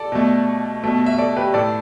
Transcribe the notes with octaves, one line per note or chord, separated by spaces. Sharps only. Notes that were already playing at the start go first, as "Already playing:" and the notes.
Already playing: A4 D5
B2 A3
B2 A3
E5
A4 D5
G4 B4
A2 A3 A4 D5